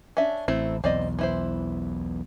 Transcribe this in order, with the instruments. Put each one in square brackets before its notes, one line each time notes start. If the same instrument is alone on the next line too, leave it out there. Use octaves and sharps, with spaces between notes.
[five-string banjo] C#4 D4 E5
[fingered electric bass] A1 [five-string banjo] A3 C4 E4
[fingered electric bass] B1 E2 [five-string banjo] C4 D5 D#5
[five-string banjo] E3 E4 C5